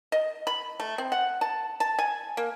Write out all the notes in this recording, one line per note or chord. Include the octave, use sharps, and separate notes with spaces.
D#5
B5
A3
C4
F#5
A5
A5
G#5
A#3